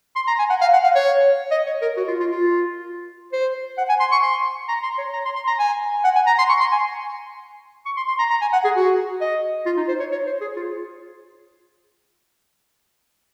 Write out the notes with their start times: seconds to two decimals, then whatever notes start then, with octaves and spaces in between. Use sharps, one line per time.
0.16 C6
0.27 A#5
0.39 G#5
0.50 F#5
0.61 F5
0.73 F#5
0.84 F5
0.95 C#5
1.51 D#5
1.67 C#5
1.82 A#4
1.97 F#4
2.08 F4
2.20 F4
2.31 F4
3.32 C5
3.78 F#5
3.89 G#5
4.00 C6
4.12 C#6
4.23 C6
4.68 A#5
4.83 C6
4.98 C#5
5.13 A#5
5.25 C6
5.36 C6
5.47 A#5
5.59 G#5
6.04 F#5
6.16 G#5
6.27 A#5
6.38 C6
6.49 C#6
6.60 C6
6.72 G#5
7.85 C#6
7.97 C6
8.08 C6
8.19 A#5
8.30 A#5
8.41 G#5
8.53 F#5
8.64 G#4
8.76 F#4
9.21 D#5
9.66 F4
9.77 D#4
9.88 C5
10.00 C#5
10.12 C#5
10.26 C5
10.41 G#4
10.56 F4